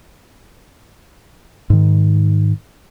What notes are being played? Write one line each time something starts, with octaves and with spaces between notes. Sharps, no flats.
G#2 D#3